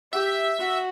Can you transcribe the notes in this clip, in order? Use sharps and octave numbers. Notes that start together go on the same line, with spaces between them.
G4 E5
F#4